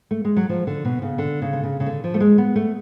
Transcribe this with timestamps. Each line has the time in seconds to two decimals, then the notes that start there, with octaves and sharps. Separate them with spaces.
0.11 A3
0.25 G#3
0.37 F#3
0.49 F3
0.67 D3
0.85 B2
1.02 C#3
1.18 D3
1.42 C#3
1.53 D3
1.63 C#3
1.80 C#3
1.86 D3
2.04 F3
2.14 A3
2.20 G#3
2.38 B3
2.56 A3